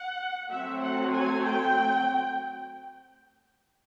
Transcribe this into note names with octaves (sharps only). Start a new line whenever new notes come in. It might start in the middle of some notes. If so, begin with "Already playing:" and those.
Already playing: F#5
F#3 A3 C4 E5
F#5
G#5
G5